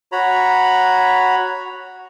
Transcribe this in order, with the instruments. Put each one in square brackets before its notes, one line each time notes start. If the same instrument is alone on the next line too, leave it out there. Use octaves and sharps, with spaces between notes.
[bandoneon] F#4 C#5 A#5 B5